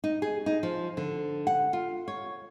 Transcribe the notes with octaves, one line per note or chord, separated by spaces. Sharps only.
D#4
G#4
D#4
F3
D3
F#5
F4
C#5